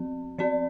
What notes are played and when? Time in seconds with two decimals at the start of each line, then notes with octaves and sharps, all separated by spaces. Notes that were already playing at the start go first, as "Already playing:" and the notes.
Already playing: F3 C4
0.38 F3 C4 D5